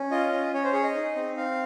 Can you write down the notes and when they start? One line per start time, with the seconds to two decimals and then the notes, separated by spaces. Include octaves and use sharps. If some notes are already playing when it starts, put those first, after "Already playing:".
Already playing: C#4
0.11 F4 D#5
0.32 C#4
0.53 C#4 C#5
0.64 C5
0.73 G#4 C#5
0.83 D#5
0.95 D#4
1.15 C4
1.37 C4 F5